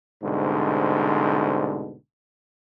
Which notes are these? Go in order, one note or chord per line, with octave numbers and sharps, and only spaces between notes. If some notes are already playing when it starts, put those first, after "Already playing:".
C2 G#2 B2 D3